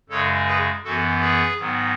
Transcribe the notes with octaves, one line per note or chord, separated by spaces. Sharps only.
F#2 C#3 G#3 A4 C#5
G#4 B4
F#2 E3 B3 F#4 A4
G#4 B4
G#2 D#3 F#3 B3